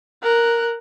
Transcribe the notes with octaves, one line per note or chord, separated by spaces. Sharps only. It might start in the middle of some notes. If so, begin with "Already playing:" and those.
A#4 F#6